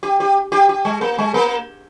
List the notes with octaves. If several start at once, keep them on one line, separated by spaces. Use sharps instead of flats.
G4
G4
G4
G4
G#3
A#3
G#3
A#3